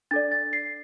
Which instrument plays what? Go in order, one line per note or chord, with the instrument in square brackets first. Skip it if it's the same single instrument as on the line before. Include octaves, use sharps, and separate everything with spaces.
[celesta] D4 A4 D5 A6
A6
C7